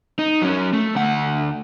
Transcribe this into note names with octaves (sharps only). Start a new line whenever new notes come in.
D#4
F#3 C#4
A3
D2 F#5